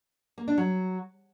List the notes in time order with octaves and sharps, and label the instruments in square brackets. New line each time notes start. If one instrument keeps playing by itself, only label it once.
[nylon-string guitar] A#3
D4
F#3